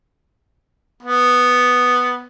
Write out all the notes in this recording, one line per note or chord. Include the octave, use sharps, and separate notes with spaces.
B3